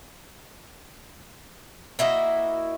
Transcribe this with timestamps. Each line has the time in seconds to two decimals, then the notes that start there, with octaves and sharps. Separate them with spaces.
1.99 A#3 E4 F#4 D#5